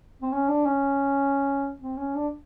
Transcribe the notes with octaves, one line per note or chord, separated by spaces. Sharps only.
C4
C#4
D4
C#4
C4
C#4
D4